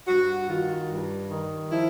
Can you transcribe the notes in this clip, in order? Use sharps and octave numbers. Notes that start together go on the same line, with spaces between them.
G2 F#4
D#3 F4
G2
D#3
F3 E4